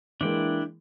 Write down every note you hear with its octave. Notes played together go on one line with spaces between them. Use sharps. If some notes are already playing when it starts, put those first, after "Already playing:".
E3 G#3 A#3 D4 E4 G5